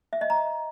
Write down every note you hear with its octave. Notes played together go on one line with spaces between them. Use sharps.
E5
D#5
A#5